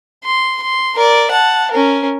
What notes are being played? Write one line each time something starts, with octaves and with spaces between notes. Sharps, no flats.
C6
C6
A#4 D5
F#5 A5
C#4 A#4